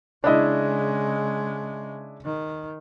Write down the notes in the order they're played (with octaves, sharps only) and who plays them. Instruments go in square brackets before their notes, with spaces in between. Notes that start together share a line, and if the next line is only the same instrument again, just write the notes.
[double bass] C#3 G#3 [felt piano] D4 E4 D#5
[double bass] D#3